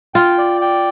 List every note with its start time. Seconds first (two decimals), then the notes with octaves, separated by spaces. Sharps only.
0.14 F4 G5
0.38 D5
0.61 G5